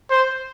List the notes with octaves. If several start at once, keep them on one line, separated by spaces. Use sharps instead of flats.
C5